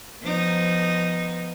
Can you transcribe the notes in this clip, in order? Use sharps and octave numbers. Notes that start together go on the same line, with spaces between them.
F3 B3 D#4